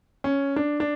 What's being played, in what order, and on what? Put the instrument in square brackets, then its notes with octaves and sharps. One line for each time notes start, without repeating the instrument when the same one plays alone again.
[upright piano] C#4
D4
D4